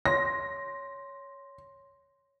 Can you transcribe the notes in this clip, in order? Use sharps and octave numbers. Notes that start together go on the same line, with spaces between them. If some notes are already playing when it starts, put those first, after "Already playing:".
C#5 C6 A#6